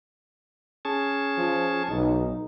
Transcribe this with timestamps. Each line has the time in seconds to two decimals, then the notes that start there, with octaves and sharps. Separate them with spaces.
0.85 C#4 G#4 A5
1.38 F3
1.89 B1 D#4